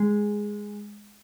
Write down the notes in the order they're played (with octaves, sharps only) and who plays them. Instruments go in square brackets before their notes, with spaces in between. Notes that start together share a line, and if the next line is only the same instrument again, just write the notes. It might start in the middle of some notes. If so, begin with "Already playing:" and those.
Already playing: [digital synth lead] G#3